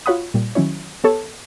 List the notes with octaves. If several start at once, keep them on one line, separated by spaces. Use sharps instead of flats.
F4 F#4 C#5 F#5 B5 D#6
A#2 G3
D#3 F#3 C#4 E4 C#5
B3 G4 A4 C#5 A5